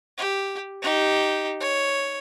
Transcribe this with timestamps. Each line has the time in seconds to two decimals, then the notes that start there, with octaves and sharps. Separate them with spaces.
0.18 G4
0.82 D#4 G4
1.60 C#5